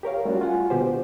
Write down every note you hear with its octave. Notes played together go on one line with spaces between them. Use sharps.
G4 A#4 C#5 F5
G3 A3 C#4 F4 F#4
F4 F#5 G#5
B2 D3 G4 C5